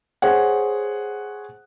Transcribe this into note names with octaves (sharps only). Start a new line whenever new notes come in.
G#4 C5 C#5 F#5